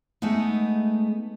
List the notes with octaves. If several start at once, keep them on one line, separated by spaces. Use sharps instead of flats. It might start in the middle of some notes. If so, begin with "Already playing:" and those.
G#3 A3 B3 D#4